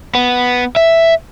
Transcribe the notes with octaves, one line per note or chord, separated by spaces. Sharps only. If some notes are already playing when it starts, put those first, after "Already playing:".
B3
E5